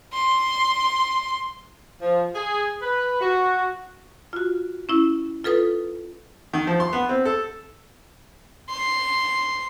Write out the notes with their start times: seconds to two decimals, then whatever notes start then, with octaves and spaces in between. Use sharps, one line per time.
0.14 C6
2.00 F3
2.35 G#4
2.82 B4
3.20 F#4
4.33 F4 F#4
4.89 C#4 E4
5.44 F4 A4 B4 D#6
6.54 D#3
6.67 F3
6.80 C6
6.93 B3
7.09 C4
7.25 A4
8.70 C6